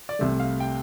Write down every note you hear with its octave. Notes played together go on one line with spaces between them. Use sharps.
D5
C2 C3 A3
F5
G5